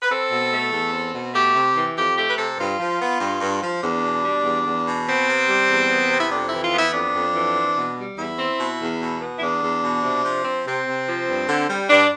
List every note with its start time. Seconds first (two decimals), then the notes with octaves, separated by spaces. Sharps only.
0.02 B4
0.10 C4 A4
0.31 B2
0.52 A3
0.72 E2
0.92 C4
1.14 B2
1.34 A3 G4
1.55 C3
1.76 E3
1.96 F2 G4
2.17 A3 G4
2.28 B4
2.37 C3 A4
2.58 G2 F4
2.79 F3
3.00 B3
3.20 G2
3.41 G2
3.62 F3
3.83 E2 D4
4.03 B2
4.24 G3
4.45 E2
4.65 E2
4.86 B2
5.06 B3 C4
5.27 C3
5.48 G3
5.69 E2
5.89 B3
6.10 C3
6.19 E4
6.31 F2 D4
6.47 E3 E4
6.62 F4
6.73 B3 E4
6.93 F2 D4
7.14 F2
7.34 E3
7.55 C4
7.76 B2
7.97 G3
8.17 E2 E4
8.38 C4
8.58 B2
8.79 E2
8.99 B2
9.20 B3
9.37 E4
9.41 E2 D4
9.62 E2
9.83 B2
10.03 C3
10.24 F3
10.44 C4
10.65 C3 C4
10.86 C3
11.06 F3
11.28 G2
11.48 D3
11.69 G3
11.89 G2 D4